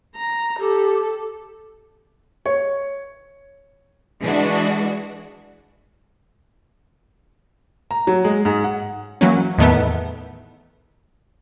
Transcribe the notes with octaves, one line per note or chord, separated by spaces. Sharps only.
A#5
G4 A4
C#5
E3 G#3 D4 F#4
A#5
F#3
G#3
G#2
F#5
E3 F#3 A#3 C#4
E2 A2 D#3 A3 B3